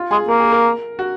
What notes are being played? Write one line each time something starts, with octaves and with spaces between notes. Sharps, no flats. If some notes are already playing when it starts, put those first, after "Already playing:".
Already playing: F4
G#3 G#4
A#3 A#4
G#4
A#4
F#4